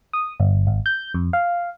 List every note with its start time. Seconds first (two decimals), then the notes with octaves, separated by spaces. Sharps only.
0.13 D#6
0.40 G1
0.67 G#1
0.86 G6
1.14 F2
1.33 F5